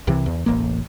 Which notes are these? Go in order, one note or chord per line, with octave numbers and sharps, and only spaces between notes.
C2 C3 E3
E2
E1 A1 A#3